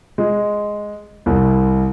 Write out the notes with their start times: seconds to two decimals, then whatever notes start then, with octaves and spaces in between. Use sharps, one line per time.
0.18 G#3
1.26 C2